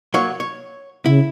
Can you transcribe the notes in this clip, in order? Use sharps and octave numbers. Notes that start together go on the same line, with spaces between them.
F#3 A#3 C#5
C#5
C#3 E4